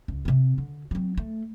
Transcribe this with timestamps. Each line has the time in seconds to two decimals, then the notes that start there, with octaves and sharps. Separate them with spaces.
0.08 C#2
0.25 C3 C4
0.58 D3
0.91 F#3 C4
1.18 A3